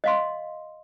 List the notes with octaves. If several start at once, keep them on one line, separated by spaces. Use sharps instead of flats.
D#5 F5 C6